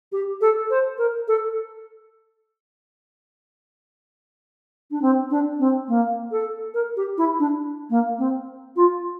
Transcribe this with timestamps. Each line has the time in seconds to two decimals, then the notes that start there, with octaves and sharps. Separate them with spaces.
0.12 G4
0.41 A4
0.70 C5
0.98 A#4
1.28 A4
4.91 D4
5.02 C4
5.30 D4
5.59 C4
5.88 A#3
6.31 A4
6.74 A#4
6.96 G4
7.17 E4
7.39 D4
7.90 A#3
8.18 C4
8.76 F4